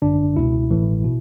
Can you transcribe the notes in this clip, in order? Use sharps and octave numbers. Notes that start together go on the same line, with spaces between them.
G1 F#2 D3 D4
C#2 B2 E4
A1 A2 E3
B2